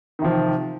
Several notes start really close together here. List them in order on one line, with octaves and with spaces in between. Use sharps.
D#3 C3 F3